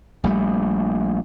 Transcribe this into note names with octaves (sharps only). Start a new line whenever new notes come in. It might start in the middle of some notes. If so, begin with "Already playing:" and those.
A#1 G3 A3